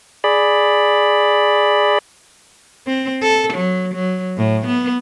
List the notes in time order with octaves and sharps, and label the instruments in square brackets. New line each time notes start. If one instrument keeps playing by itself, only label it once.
[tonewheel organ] G#4 D5 B5
[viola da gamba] C4
A4
F#3
F#3
A2
B3